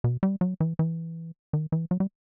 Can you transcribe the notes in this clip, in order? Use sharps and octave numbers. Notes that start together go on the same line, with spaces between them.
B2
G3
F#3
E3
E3
D#3
E3
F#3
G3